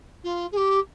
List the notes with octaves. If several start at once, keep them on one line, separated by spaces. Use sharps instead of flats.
F4
G#4
G4